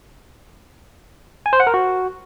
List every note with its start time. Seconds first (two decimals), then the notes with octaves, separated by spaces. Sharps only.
1.46 G#5
1.53 C5
1.60 F#5
1.67 A#4
1.74 F#4